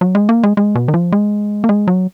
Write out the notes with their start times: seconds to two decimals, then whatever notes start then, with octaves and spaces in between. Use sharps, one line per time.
0.01 F#3
0.15 G#3
0.29 A#3
0.43 G#3
0.57 G#3
0.75 B2
0.88 D#3
0.94 F3
1.12 G#3
1.64 A#3
1.69 G#3
1.87 F#3